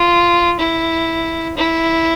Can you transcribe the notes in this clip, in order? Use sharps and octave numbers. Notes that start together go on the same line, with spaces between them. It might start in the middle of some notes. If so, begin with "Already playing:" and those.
Already playing: F4
E4
E4